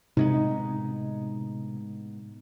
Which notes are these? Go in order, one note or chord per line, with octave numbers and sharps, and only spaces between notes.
A2 C3 G#3 B3 D#4